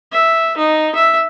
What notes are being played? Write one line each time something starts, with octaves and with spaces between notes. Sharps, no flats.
E5
D#4
E5